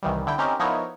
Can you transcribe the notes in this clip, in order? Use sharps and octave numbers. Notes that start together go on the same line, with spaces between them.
C2 D#3 E3 G3
D3 E4 G5
C4 C#4 D#4 G4 A#4
F3 B3 D#4 E4 A#4 C#5